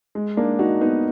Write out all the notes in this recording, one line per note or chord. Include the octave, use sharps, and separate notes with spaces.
G#3
A#3 D4
D#4 F#4
B3 D#4